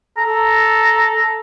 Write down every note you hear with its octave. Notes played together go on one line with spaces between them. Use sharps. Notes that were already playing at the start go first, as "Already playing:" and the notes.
A4 A#5